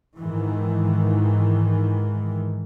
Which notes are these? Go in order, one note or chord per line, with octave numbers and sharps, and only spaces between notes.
G#2 D#3 E3